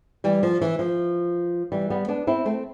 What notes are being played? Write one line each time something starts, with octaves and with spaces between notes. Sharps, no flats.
E3 G3
F3
E3
F3
E3 G3
G3 B3
B3 D4
C4 E4
A3 C4